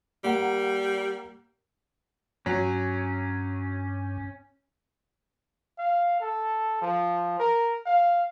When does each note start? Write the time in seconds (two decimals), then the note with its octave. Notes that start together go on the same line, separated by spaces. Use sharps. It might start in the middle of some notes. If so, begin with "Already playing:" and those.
0.24 G3 A#3 F#5
2.46 G2 F#3 C#4
5.78 F5
6.21 A4
6.82 F3
7.39 A#4
7.86 F5